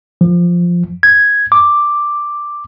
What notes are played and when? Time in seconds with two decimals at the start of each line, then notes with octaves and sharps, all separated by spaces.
0.21 F3
1.03 G#6
1.52 D6